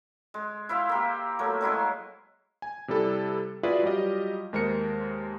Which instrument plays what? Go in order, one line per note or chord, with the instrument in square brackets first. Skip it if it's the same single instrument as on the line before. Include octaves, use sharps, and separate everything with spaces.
[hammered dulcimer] G#3
E4 C5 E5 F5
A#3 G4
F#3 A3 A#3
F#3 G#3 E4 C6
[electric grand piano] G#5
C3 G3 E4 A4
F4 F#4 G#4 B4 D5 E5
F#3 G3 F4 G4 D#5
D#2 G#3 A#4 C5 C#7